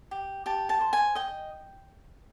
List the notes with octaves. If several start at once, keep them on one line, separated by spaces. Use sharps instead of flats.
G4
G4 A5
A5
C5
G#5
D#5 G5